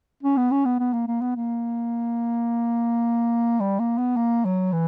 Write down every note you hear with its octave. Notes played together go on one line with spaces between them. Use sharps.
C#4
B3
C#4
B3
B3
A#3
A#3
B3
A#3
G3
A#3
B3
A#3
F#3
E3